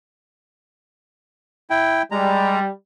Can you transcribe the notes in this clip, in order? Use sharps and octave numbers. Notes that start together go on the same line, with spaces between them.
E4 G5
G3 G#3 A#5